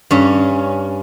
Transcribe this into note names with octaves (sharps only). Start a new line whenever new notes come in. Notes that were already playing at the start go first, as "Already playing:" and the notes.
G2 C#4